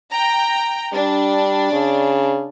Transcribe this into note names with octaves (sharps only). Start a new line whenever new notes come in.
G5 A#5
G3 D4
C#3